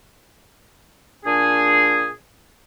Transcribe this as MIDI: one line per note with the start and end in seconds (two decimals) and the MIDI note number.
1.25 2.09 46
1.25 2.09 62
1.25 2.09 68